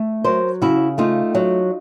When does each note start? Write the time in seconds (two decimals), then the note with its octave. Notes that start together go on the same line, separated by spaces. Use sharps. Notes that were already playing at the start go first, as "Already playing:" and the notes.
Already playing: A3
0.24 F#3 A#4 C5
0.62 C#3 E4 F#4
0.98 A3 D#4 F4
1.35 F#3